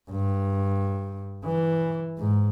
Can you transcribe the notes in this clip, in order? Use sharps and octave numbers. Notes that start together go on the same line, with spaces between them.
G2
E3
G#2